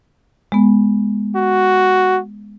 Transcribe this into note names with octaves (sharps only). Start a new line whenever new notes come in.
G#3 B3
F#4